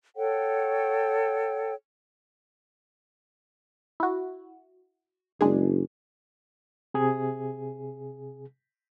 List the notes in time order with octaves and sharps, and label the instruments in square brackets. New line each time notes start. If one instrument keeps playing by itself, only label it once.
[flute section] A4 C#5 F#5 G5
[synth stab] E4 F#4
[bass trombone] F#1 [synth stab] G#3 D4 G#4
[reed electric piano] C3 G#4